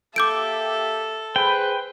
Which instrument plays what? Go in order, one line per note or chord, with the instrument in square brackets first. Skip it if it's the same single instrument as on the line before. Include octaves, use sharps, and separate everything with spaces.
[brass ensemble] A#3 G4 E5 [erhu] A4 [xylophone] D6 G6 D7
[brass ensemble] G#4 B4 C5 [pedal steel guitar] G5